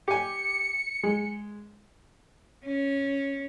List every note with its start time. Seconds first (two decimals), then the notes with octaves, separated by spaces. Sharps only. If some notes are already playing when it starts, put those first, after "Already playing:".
0.08 G4 G#5 C#7
1.03 G#3
2.65 C#4